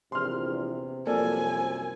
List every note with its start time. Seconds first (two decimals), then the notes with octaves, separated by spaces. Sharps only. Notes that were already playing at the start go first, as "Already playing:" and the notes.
0.12 A#1 E2 C3 C6 F6
1.06 C2 F#2 F3 A#3 A4 D5 G#5